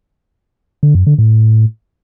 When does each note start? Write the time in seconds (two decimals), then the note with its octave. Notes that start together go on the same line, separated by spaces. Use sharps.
0.83 D3
0.95 F#2
1.07 D3
1.19 A2